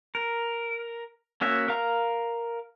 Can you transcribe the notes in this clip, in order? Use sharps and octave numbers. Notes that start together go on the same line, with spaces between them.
A#4
A#3 C#4 F#4 E5
A#4 F5 A#5 F6